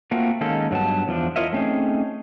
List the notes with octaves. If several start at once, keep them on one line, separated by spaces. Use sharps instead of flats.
A3 A#3 C4 F4 F#4
D#3 G#3 A#3 C#4 D#4 A4
G2 F#3 B3 A5
E2 F3 D4
E4 F4 A#4 C#5 D#5 E5
A3 C4 C#4 D#4 G#4